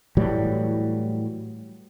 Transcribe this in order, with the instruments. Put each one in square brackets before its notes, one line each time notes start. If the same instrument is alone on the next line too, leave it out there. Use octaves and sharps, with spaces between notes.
[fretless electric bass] A2 E3 F#3 G3